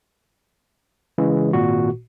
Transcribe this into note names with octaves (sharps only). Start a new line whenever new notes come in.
C#3 E3 G#3
G#1 A#2 F#4